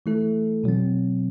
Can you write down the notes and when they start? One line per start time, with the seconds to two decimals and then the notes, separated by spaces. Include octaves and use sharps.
0.06 E3 A3 E4 A4
0.64 B2 F#3 C4